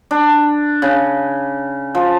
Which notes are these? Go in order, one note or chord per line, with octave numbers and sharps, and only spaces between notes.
D4
C#3
F3